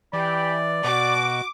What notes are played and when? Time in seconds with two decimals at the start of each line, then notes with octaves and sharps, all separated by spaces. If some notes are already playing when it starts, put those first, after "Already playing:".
0.13 E3 G4 D5 G5 B5
0.84 B2 F#4 D6